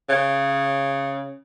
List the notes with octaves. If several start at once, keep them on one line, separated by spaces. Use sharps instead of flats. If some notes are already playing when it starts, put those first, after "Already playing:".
C#3